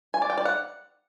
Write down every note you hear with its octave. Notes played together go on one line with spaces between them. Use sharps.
G#5
D5
G5
D5
F#5